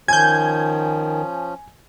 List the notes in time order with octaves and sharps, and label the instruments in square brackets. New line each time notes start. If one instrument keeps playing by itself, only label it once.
[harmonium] D#3 [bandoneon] F3 C#4 [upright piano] G#5 [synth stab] G6 G#6